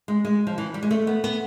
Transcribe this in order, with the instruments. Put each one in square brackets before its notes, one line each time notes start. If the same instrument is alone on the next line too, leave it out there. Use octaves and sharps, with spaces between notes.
[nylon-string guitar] G#3
G#3
F3
E3
G3
G#3
A3
B3
B3